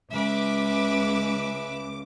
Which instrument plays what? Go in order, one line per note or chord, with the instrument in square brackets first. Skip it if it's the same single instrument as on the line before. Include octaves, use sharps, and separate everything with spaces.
[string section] C#2 D6 [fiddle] B4 E5